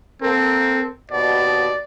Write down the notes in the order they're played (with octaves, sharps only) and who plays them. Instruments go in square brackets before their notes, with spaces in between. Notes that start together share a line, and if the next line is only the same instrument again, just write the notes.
[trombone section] A#3 A4 A#4 [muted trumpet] C4
[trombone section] D#2 B2 [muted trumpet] D5